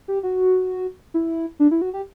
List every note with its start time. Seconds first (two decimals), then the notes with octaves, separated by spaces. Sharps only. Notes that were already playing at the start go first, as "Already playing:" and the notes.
0.08 G4
0.23 F#4
1.14 E4
1.59 D4
1.71 E4
1.82 F#4
1.94 G4